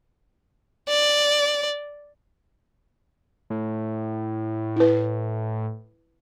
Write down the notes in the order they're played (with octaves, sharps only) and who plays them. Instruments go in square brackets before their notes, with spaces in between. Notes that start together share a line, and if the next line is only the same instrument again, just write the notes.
[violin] D5
[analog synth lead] A2
[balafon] E4 B4